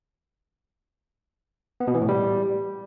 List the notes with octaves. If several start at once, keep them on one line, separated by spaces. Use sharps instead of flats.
B3
B2
E3
A2
G3